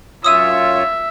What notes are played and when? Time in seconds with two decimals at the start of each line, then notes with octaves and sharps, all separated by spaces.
0.24 F#2 F4 C#5 E5 D#6 E6 D#7